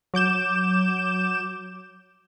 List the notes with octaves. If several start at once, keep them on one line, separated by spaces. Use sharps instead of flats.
F#3 D6 G6 E7